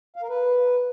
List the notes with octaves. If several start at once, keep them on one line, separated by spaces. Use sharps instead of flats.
F5
A#4
B4